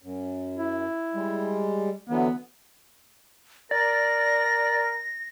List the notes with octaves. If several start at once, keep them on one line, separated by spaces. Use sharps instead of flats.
F#2
E4
G3 G#3
D3 E3 F#3 B3
A#4 D5 A#6